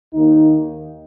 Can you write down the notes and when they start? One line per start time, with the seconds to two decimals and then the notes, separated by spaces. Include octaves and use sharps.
0.14 D#2 D#3 A#3 D#4